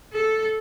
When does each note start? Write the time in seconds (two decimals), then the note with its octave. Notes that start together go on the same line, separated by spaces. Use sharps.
0.13 A4